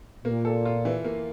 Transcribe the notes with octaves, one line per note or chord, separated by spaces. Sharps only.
A#2 A#3
A4
F4
E3
A#3